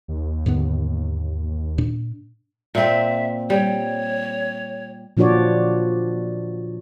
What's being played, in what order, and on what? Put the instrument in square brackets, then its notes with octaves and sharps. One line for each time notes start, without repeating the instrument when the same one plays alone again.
[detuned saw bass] D#2
[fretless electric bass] G#2 D3 B3
A#2 D4
[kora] A#2 C4 [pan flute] E5
[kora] G3 [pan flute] C#5
[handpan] A#2 F3 D4 F#4 C#5 D5